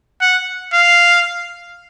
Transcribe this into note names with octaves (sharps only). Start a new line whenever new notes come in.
F#5
F5